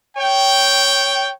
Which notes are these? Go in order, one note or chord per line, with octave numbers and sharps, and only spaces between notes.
C#5 G5